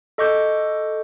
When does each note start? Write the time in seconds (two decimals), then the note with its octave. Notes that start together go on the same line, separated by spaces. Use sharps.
0.18 A4 D#5 C#6 D6 G6